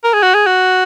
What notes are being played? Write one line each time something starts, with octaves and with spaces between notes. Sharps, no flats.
A#4
G#4
F#4
G#4
F#4